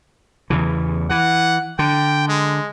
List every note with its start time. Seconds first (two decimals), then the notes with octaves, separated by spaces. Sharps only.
0.50 E2 C#3 E3
1.10 E3 F#5
1.79 D3 G5
2.28 G#3